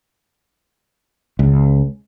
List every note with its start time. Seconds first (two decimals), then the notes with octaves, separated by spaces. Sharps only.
1.39 C#2